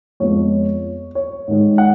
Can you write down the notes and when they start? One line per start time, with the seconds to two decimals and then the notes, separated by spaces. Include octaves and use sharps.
0.20 F2 F3 G#3 B3 C#5
1.15 C#5
1.48 G#2 D#3 G#3
1.78 F#5